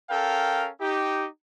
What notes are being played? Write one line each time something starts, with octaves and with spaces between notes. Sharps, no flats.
C#4 A4 A#4 F5 G5
D#4 G4